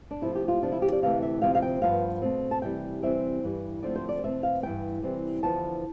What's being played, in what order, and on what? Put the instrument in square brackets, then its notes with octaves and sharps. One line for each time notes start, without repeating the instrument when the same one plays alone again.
[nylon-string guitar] D4
C3 F3 A3 E4
G4
F4
D2 C3 F3 D4
E4
G4
D5
D2 C3 E3 A3 F5
E5
D2 C3 F3 C4 F5
F5
G5
G2 F3 B3 F5
B2 A3 C4
A5
C3 E3 G3 G5
C3 E3 G3 C4 E5
G2 E3 G3
D2 D3 F3 A3 C4 D5
C5
D5
E2 B2 A3 C4 E5
F5
G2 E3 B3 G5
C3 E3 G3 C4
E2 D3 F3 B3 A5